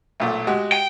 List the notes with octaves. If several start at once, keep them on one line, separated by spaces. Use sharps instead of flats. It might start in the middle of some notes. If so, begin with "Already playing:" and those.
B1 A#2 A3
G#3 F#4 G4
G5